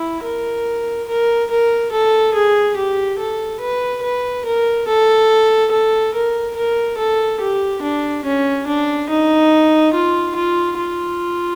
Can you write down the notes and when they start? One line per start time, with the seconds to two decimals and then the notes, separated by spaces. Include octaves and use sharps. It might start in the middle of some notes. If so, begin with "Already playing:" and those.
Already playing: E4
0.23 A#4
1.08 A#4
1.50 A#4
1.92 A4
2.34 G#4
2.76 G4
3.19 A4
3.61 B4
4.03 B4
4.45 A#4
4.87 A4
5.71 A4
6.14 A#4
6.56 A#4
6.98 A4
7.40 G4
7.82 D4
8.25 C#4
8.67 D4
9.09 D#4
9.94 F4
10.36 F4
10.77 F4